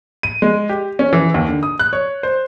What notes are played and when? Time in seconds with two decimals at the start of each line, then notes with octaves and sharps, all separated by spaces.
0.23 D#7
0.42 G#3
0.69 G4
0.99 C#4
1.13 E3
1.34 D#2
1.48 D3
1.63 D#6
1.79 F#6
1.93 C#5
2.23 C5